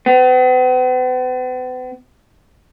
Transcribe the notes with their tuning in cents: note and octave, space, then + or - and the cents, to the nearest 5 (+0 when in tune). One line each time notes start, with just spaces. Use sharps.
B3 +45